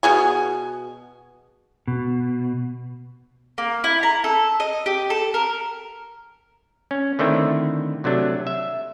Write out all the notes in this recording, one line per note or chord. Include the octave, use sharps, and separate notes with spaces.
B2 G#4 G#5
B2
A#3
E4
A#5
A4
D#5
G4
A4
A#4
C#4
D3 D#3 A3 C4 E4
C3 F#3 A3 D4
E5